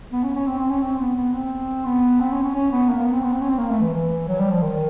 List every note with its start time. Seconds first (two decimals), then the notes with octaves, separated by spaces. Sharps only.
0.12 B3
0.23 C#4
0.35 C#4
0.47 C4
0.59 C4
0.70 C#4
0.82 C4
0.99 B3
1.16 B3
1.34 C4
1.86 B3
2.20 C4
2.32 C#4
2.43 C#4
2.55 C#4
2.72 B3
2.89 A#3
3.01 B3
3.12 C4
3.24 B3
3.32 C4
3.41 C#4
3.50 C4
3.58 A#3
3.70 A3
3.82 E3
3.93 E3
4.28 F#3
4.39 G3
4.51 F3
4.62 D#3